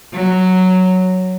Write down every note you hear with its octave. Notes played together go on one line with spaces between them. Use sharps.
F#3